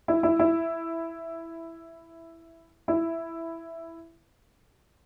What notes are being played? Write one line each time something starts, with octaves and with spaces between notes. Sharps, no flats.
E4
E4
E4
E4